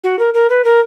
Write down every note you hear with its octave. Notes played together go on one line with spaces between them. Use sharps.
F#4
A#4
A#4
B4
A#4